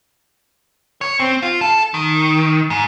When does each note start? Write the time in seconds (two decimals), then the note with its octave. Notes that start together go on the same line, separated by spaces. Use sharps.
1.01 C#5
1.20 C4
1.42 F4
1.61 A4
1.94 D#3
2.70 G#2